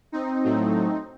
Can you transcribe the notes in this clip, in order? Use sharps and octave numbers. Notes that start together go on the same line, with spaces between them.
C4 D#4
A2 F#3 A3